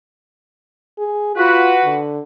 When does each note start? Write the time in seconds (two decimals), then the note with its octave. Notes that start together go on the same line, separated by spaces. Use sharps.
0.99 G#4
1.36 F4 F#4 B4
1.85 D3